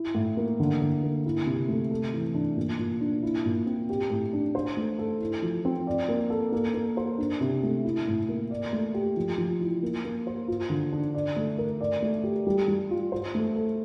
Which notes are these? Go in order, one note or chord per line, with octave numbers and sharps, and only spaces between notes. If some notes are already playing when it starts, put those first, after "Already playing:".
Already playing: E4
A2
A#3
D3
D3
A#3
E4
C3
A3
A4
E3
D4
A#2
A#2
D4
E4
A#2
C4
G4
A2
D4
C5
A3
A4
E4
F3
C4
D5
A#3
A4
A#3
A#3
C5
D4
C3
A3
E4
A2
A#3
D5
A3
G4
F3
F3
E4
A#3
A#3
C5
F4
D3
D4
D5
A3
A#4
D5
A3
G4
G3
G3
F4
C5
A3
A4